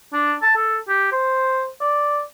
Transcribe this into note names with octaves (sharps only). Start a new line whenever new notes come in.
D4
A5
A4
G4
C5
D5